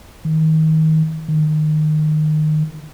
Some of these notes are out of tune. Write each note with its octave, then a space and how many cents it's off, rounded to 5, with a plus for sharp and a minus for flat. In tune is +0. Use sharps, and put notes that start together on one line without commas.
D#3 +25
D#3 -20